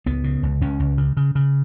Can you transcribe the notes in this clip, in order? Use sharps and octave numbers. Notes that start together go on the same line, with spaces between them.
C#2 B3
C#3
C#2
C#2 C#4
C#2
C#3
C#3
C#3